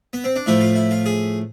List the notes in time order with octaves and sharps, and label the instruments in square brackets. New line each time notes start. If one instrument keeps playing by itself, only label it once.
[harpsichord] B3
C4
D4
A2 F3 A3 E4
F4
E4
F4
G#4